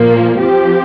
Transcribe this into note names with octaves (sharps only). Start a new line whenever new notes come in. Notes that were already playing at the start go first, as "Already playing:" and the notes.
Already playing: A#2 F3 A#3
F3 C4 G4